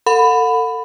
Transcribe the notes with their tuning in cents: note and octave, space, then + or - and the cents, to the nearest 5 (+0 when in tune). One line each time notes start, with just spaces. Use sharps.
A4 +35 F#5 -35 B5 +15